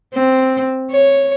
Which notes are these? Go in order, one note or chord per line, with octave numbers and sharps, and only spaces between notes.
C4
C#5